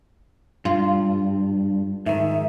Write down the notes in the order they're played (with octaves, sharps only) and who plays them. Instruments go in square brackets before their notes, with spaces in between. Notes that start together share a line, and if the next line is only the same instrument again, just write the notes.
[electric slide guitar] G2 [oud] F4
[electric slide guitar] G#2 D#3 [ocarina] E5